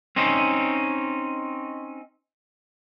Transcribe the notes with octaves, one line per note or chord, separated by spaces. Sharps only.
C4 C#4 D#4